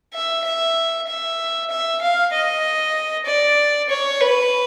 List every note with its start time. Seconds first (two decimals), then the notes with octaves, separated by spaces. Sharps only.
0.13 E5
0.44 E5
1.07 E5
1.70 E5
2.01 F5
2.32 D#5
3.26 D5
3.89 C#5
4.20 B4